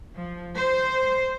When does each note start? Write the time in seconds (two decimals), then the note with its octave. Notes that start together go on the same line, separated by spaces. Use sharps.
0.14 F3
0.54 C5